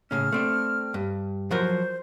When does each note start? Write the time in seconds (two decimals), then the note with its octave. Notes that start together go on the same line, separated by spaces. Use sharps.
0.11 A2 C#3 C#4 F6
0.32 A3 C4 D4
0.94 G2
1.51 F3 F#3 A#4 C5